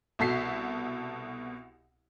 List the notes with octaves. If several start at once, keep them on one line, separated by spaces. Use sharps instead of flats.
C2 B2 A4 B6 C7